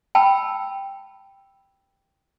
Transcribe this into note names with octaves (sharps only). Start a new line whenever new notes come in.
G5 A5 B5 E6